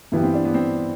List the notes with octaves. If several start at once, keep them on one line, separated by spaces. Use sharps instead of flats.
G2 E3 G3 B3
C4
D4
B3
C4